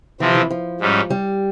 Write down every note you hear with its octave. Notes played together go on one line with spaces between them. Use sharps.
C3 E3 F3 C4
E3
F3
G#2 G3 C#4
G3